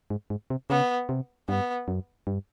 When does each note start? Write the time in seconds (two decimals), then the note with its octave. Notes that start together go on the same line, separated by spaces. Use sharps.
0.10 G#2
0.30 G#2
0.50 C3
0.70 C#3 B3
1.09 C3
1.49 G2 B3
1.88 F#2
2.27 G2